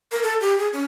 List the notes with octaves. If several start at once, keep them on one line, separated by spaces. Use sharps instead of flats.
A#4
A4
G4
G#4
C#4